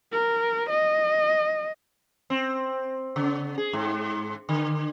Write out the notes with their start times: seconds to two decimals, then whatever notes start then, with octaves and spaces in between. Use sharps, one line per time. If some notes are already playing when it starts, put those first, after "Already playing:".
0.12 A#4
0.70 D#5
2.30 C4
3.16 C#3
3.58 G#4
3.73 G#2
4.49 D3